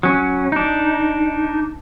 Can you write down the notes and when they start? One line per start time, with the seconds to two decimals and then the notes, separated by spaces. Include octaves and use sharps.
0.03 F#3 C#4
0.52 D4 D#4